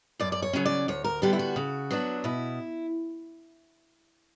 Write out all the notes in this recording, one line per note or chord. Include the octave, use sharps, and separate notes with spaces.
F#2 D5
D5
C#5
C#3 F#3 C#4
D5
D2 C#5
A#4
D3 G3 B3 G4
E4
F#4
C#3
F#3 B3 D4
B2 E4